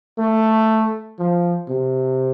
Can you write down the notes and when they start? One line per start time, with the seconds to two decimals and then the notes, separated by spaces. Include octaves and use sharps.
0.18 A3
1.19 F3
1.69 C3